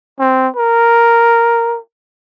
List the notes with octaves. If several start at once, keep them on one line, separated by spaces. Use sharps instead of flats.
C4
A#4